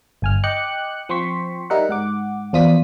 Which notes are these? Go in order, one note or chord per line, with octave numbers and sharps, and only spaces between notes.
G1 G#5 F6
D#5 G5 D6 F#6 C#7
F3 C4 G5 C6 C#6 B6
G3 D#4 A#4 E5 F#5
G#2 F#5 D6
E2 F3 F4 D5 D#6 B6